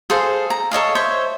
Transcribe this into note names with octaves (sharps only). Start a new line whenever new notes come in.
G#4 A4 C5 F5
A#5
A4 C#5 D#5 F5
C5 C#5 E5